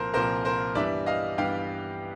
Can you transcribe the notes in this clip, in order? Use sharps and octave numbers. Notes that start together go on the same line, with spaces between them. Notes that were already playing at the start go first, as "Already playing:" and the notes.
Already playing: C2 A#2 F3 A#4 C5
C2 A#2 F3 A#4 C5
A#4 C5
G2 E3 G3 B3 D5 E5
D#5 F5
G2 E3 G3 B3 F5 G5